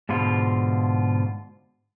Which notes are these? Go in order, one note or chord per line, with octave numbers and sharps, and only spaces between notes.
G#2 B2 D3 F4